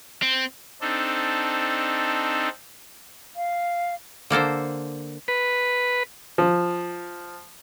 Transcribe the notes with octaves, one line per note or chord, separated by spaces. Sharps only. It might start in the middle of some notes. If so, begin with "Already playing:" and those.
C4
C4 D4 D#4 A4
F5
D3 A#3 A4 C5
B4
F3